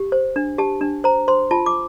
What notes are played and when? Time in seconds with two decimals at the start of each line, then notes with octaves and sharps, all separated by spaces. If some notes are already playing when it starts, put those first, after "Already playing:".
Already playing: G4
0.12 C5
0.36 D4
0.58 G4 A5
0.81 D4
1.04 C5 A#5
1.28 C5 C6
1.51 F4 A5
1.66 D6